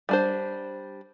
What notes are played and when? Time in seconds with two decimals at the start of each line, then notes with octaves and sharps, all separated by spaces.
0.09 G3 D4 C5